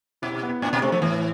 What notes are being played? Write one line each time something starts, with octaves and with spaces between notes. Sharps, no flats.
B2 E4
B3
A2 D4
B2
C3 A3
F3
A2 E3